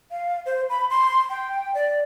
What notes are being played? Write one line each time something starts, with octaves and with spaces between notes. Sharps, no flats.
F5
C5
B5
C6
G5
D5